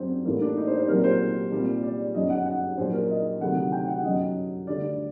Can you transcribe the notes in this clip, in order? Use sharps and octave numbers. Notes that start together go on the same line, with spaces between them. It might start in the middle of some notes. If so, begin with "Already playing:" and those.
Already playing: F#2 F#3 C4 D4
A1 A2 G3 A#3
D4
D#4
C5
C5
C2 A#2 F#3 A#4
C5
C2 A#2 G3
D5
G1 F#2 F#3 D#5
F#5
F#5
A#1 A#2 F#3 C5
A#4
D#5
D2 C3 D#3 F#3 F#5
F#5
G5
F#5
G1 F#2 F#3 D#5
D2 D3 G3 D5